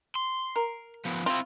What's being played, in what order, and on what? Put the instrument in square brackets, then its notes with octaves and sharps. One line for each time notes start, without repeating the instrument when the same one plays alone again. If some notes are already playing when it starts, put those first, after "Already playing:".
[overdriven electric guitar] C6
[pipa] A#4
[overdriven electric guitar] F3 B3
[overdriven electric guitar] C4 E4 [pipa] F4